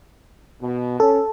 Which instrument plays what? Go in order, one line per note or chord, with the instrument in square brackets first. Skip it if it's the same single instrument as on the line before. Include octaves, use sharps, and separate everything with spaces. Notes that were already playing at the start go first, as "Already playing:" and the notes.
[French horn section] B2
[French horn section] C#4 [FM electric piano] A4